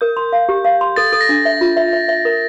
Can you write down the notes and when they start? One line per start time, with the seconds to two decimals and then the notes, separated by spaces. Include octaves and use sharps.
0.01 A#4 G6
0.17 C6
0.33 F5
0.49 G4
0.65 F5
0.81 C6
0.96 A4 A6
1.12 A4
1.21 A#6
1.29 D4
1.45 E5
1.61 F4
1.77 E5
1.93 E5
2.08 E5
2.25 A#4